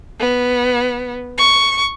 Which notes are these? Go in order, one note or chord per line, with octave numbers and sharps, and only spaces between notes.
B3
C#6